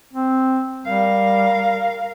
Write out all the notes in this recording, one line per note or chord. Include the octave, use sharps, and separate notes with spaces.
C4
G3 A#4 F5